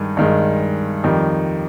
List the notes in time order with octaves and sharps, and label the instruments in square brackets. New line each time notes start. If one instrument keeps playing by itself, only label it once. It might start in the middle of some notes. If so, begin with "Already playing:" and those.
Already playing: [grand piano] G2 D#3 G#3
G2 D#3 G#3
F2 D#3 G3